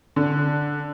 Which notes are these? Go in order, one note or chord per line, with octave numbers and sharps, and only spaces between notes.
D3